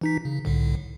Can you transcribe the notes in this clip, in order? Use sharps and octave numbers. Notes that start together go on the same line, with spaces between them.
E3 D#4 B6
C#3
C2 A2 D3